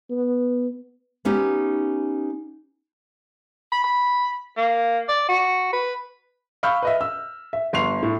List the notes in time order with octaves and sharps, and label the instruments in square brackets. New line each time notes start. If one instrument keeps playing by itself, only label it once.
[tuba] B3
[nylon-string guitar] B3 C#4 D#4 G4
[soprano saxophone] B5
B5
A#3
D5
F#4
B4
[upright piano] F5 B5 C#6 E6 F6 G6
B4 D#5 E5
E6
E5
G1 C6 C#6 C7 F7
A2